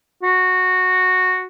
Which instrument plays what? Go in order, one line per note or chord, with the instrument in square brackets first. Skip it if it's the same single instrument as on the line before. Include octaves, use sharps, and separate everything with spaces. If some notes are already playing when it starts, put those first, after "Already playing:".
[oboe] F#4